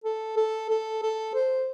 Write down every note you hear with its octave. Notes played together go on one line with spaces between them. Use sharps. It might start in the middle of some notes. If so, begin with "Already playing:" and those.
A4
A4
A4
A4
C5